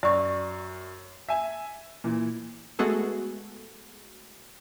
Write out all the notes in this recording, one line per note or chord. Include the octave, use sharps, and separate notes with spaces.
F#2 D5 C#6
E5 G#5
A#2 E3
G#3 A3 B3 F#4 G#4 A4